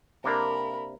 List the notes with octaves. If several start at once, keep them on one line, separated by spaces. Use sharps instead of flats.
C3 A#3 D4 A#4 B5